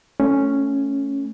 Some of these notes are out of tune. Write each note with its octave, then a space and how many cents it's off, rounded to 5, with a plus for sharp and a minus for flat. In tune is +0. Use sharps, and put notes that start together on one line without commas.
A3 +10 C#4 +0